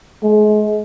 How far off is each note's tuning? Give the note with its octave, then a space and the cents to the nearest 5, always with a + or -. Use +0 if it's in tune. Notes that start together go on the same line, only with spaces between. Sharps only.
G#3 +35